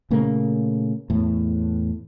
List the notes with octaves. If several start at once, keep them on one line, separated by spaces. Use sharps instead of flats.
A#2 C#3 A3 A#3
E2 A2